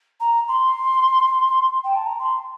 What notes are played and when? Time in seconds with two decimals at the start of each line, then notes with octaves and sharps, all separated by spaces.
0.20 A#5
0.48 C6
1.84 G5
1.95 A5
2.06 A#5
2.18 C6